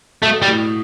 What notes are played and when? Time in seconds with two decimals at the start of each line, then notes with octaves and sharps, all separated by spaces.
0.22 B2 A3
0.42 G3
0.48 A2